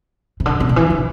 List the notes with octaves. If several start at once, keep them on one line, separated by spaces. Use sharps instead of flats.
C3
D3
C3
D3
E3
D3